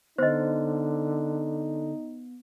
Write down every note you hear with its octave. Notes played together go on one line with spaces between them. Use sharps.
D3 B3 D#4 C5 D#5